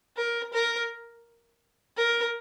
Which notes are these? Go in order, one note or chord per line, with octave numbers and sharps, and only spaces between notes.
A#4
A#4
A#4